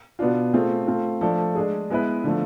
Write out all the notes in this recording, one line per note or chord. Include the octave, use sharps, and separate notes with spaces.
B2 B3 D4 F4
A3 C4 F4 G#4
A3 C4 F4
F3 A3 D4 A4
G#3 D4 G#4
G#3 B3 E4 B4
D3 F3 A3